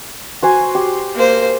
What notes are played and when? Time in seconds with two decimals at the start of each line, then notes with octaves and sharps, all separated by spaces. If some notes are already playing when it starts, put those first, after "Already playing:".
0.42 F#4 C5 G#5
0.75 G4
1.15 A#3 C5